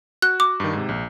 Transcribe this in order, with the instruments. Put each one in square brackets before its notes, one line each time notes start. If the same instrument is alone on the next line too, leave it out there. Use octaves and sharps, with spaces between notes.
[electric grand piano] F#4 [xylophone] F#6
[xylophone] D6
[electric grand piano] G2 D#3
G#2 C3
A#1